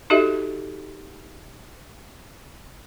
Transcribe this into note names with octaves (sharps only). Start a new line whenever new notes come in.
D#4 F#4 G4 A4 D#5 E5